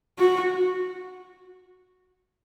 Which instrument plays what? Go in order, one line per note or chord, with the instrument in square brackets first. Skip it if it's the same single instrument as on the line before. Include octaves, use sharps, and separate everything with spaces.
[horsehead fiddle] F#4